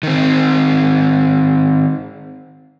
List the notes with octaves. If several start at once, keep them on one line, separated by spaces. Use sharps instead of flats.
D#3 C4